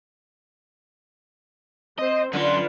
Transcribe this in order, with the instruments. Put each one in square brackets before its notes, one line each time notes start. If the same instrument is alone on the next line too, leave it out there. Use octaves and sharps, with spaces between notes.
[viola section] C4 C5 [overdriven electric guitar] D#5
[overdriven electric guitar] F#2 C6 [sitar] D3 [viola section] F4 B4